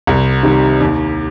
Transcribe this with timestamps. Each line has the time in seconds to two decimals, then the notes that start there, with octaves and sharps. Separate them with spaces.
0.07 C2
0.43 C3 D#3 G3
0.81 D#2